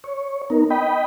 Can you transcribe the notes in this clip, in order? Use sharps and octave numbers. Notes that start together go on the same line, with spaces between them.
C#5
B3 D#4 A#4
D#5 G5 B5